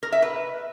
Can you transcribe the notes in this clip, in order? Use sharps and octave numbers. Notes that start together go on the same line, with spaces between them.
A#4
E5
B4